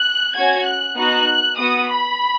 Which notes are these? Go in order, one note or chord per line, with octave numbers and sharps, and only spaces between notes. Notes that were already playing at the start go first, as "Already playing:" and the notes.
Already playing: F#6
C#4 F#4 G#6
F#6
B3 D#4 F#4 F#6
B3 F#4 D#6
B5